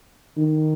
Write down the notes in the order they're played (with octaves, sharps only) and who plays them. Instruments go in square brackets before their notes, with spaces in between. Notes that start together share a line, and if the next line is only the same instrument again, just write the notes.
[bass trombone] D#3